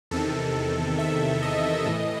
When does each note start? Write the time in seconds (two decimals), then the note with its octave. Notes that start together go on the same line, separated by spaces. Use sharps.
0.11 E2 C3 D#3 A4
0.98 E5
1.42 D#5
1.86 A2 E3